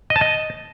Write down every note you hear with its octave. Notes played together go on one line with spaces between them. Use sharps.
D#5
A5
D#5